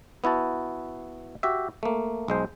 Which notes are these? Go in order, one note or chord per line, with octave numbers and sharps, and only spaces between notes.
B3 E4 F#4 A5
F#4 G4 E5
A3 A#3
B1 G#3 C5